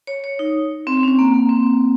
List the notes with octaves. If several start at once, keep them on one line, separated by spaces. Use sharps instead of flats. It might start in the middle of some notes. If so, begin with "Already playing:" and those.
C#5
C#5
D#4
C4
C4
C#4
C4
A#3
A#3
C4